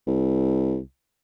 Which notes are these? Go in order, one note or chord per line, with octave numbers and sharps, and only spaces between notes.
C2